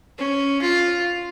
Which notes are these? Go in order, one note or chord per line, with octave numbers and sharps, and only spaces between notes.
C#4
F4